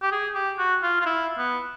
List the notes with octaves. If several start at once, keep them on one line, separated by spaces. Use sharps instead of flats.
G4
G#4
G4
F#4
F4
F4
E4
B3